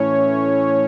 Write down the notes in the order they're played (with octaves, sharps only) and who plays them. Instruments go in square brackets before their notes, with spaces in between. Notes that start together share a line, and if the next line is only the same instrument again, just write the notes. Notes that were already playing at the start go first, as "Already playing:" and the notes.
Already playing: [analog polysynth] A2 E3 C#4